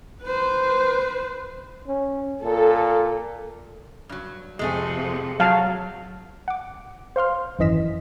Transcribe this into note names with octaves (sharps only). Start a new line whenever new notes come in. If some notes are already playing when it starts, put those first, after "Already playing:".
B4 C5
C#4
A#2 A4
G2 F#3
F2 C3 G#3 A3 G#4
F#3 F5 A5
F#5 D6
C5 F5 C6 F6
G#1 F#2 E3 D#5 B6 E7